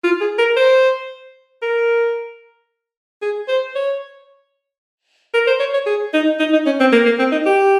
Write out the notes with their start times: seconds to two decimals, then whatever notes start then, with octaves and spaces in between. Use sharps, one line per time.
0.04 F4
0.21 G#4
0.39 A#4
0.57 C5
1.62 A#4
3.22 G#4
3.48 C5
3.75 C#5
5.34 A#4
5.47 C5
5.60 C#5
5.74 C#5
5.86 G#4
6.14 D#4
6.40 D#4
6.53 D#4
6.66 C#4
6.80 C4
6.92 A#3
7.06 A#3
7.19 C4
7.32 D#4
7.46 G4